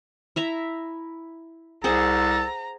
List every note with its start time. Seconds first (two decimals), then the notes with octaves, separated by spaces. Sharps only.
0.36 E4 E5 A#5
1.84 C2 G#4 A4 C5 F#5 A#5